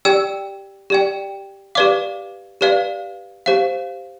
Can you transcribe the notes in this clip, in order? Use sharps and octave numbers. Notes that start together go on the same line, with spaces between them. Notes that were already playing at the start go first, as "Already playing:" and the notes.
G4 D5 G5 E6
G4 D5 G5
G4 B4 D5 F5 D6
G4 B4 D5 F5
G4 C5 F5